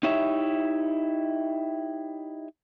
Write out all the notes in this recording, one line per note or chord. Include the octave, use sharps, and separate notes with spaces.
D#4 E4 G4 C#5 E5